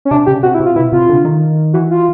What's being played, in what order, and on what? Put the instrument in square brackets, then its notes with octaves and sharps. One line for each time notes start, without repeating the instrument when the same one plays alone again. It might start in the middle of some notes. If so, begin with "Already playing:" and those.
[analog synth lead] C#4
[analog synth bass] C3 [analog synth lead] D4
[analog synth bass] C#3 [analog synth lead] G4
[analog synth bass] C3 [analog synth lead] F#4
[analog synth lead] E4
[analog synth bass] C3
[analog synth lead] F4
[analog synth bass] B2 [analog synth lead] E4
[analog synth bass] C3 [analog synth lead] F4
[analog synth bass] D3
D#3
[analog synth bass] E3 [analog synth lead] F#4
[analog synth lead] F4